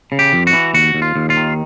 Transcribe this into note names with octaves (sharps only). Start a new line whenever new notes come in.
C#3
G4
F2
F#4
E3
D#2 F#4
D#2
F4
D#2
F4
D#3